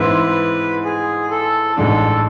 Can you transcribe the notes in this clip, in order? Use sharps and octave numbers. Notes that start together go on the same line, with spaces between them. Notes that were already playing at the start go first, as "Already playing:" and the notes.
Already playing: G#2 E3 G#3 C4 E4 B4
G#4
A4
A1 G#2 G#3 D4 A4